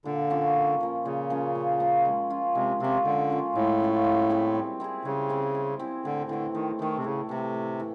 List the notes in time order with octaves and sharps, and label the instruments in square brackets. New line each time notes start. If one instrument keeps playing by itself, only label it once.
[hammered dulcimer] A#2 [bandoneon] D3
[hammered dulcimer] F3 A#3 C#4
A#2
F3 A#3 C#4
[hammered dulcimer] A#2 [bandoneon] C#3
[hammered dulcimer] F3 A#3 C#4
A#2
F3 A#3 C#4
G#3
C#4 F4
[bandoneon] C3 [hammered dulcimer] G#3
[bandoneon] C3 [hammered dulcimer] C#4 F4
[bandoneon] D3 [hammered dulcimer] G#3
[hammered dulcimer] C#4 F4
[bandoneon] A2 [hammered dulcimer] G#3
[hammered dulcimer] C#4 F4
G3
C4 E4 G#4
G3
C4 E4 G#4
[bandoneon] C#3 [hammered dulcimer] G3
[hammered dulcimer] C4 E4 G#4
G3
C4 E4 G#4
[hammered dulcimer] A2 [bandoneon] D3
[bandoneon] D3 [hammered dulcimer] E3 A3
[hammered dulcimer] A2 [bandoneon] D#3
[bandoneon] D#3 [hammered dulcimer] E3 A3
[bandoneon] C3
[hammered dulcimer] A2 [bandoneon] C#3
[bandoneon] C3 [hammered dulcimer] E3 A3
[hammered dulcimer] A2
E3